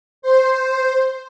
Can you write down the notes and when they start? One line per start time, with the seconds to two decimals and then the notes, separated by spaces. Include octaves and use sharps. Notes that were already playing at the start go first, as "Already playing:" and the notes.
0.22 C5